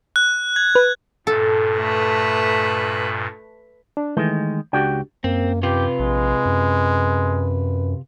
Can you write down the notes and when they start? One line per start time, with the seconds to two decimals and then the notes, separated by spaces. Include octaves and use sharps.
0.16 F#6
0.56 G#6
0.75 B4
1.27 G2 A#2 A4
1.78 A3 B4
3.97 D4
4.17 D#3 E3 G#3 A3 G6
4.73 C#2 D4 F#4 G4 G5
5.24 F#2 A#3 C4
5.63 C3 F4 G4 B4
5.99 A#1 G#3
6.45 F#2